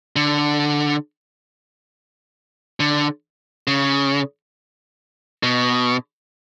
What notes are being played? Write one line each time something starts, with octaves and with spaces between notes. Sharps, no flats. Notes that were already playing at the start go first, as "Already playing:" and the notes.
D3
D3
C#3
B2